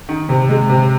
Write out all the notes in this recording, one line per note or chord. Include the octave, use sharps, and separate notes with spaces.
D#3
C3
G#3
C3